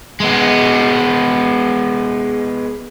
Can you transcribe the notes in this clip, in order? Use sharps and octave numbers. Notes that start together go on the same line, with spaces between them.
G#3 B3